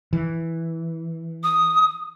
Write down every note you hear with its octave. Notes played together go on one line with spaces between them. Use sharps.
E3
D#6